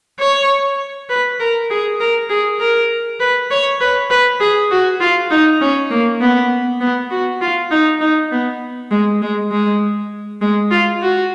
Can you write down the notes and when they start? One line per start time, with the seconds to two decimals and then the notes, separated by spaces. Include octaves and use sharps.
0.19 C#5
1.09 B4
1.40 A#4
1.70 G#4
2.00 A#4
2.30 G#4
2.60 A#4
3.20 B4
3.50 C#5
3.80 B4
4.10 B4
4.40 G#4
4.70 F#4
5.00 F4
5.31 D#4
5.61 C#4
5.90 A#3
6.21 B3
6.80 B3
7.10 F#4
7.41 F4
7.71 D#4
8.01 D#4
8.31 B3
8.91 G#3
9.22 G#3
9.51 G#3
10.41 G#3
10.71 F4
11.01 F#4